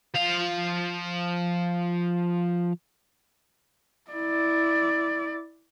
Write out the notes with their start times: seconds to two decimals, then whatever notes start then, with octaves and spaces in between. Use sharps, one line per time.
0.15 F3 F5
4.11 E4 D5